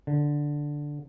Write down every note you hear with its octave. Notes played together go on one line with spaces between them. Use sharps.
D3